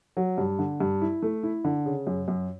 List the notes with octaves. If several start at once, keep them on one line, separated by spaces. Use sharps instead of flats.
F#3
G2
D3
G2
E4
A3
E4
D3
C#3
F#2
F#2